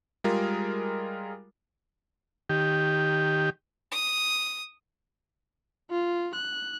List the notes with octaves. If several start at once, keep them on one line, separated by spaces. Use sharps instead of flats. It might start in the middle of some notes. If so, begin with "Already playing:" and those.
G3 G#3 F4 G#4 A#4
D#3 G4
D#6
F4
F#6